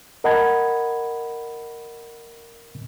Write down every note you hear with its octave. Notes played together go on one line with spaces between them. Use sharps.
A#4 D#5 F#5 A5 B5 G#6